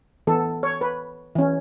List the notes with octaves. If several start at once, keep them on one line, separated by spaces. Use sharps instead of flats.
E3 B3 A4
C#5
B4
E3 C#4